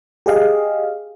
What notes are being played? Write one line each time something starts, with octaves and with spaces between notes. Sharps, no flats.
G4 G#4 D#5 F5